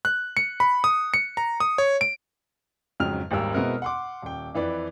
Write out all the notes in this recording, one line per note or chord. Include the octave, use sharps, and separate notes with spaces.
F#6
C#7
B5
D#6
C#7
A#5
D#6
C#5
D7
F2 G#2 C#3 F#3 F6 F7
G#1 D#2 G#2 G3 A#4 E6
B2 G#3 B3 C4 E4 A#4
F#5 C6 D6
D#1 G5
F2 E3 B4 D5